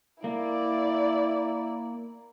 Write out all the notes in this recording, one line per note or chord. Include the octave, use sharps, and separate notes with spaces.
A#3 E4 D5